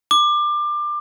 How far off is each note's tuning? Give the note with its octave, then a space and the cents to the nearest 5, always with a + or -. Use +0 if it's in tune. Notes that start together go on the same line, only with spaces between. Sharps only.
D6 +25